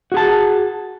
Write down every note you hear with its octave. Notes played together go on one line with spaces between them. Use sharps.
F#4 G#4 A5